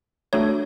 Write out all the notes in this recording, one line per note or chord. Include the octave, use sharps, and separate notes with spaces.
A3 D4 F#4 A4 C#5